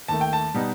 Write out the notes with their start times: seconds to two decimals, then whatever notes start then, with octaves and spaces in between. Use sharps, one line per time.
0.08 D#2 D#3 A3 A5
0.21 G5
0.33 A5
0.54 B2 G3 B3 D#4